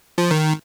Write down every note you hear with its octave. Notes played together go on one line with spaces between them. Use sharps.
F3
D#3